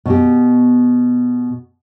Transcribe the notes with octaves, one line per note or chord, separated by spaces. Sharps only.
B2 G4